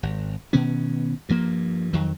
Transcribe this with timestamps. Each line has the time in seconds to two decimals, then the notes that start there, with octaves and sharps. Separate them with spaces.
0.03 G#1
0.53 B2 D#3 B3 C#4
1.29 G2 F3 A#3
1.93 F2 D#3 F#3